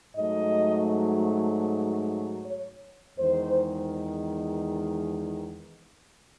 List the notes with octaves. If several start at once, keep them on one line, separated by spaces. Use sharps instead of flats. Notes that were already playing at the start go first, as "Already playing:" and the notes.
G#2 F#3 A3 D#5
C#5
E2 D#3 G#3 C5